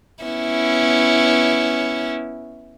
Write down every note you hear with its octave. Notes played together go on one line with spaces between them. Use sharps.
B3 C#4 E4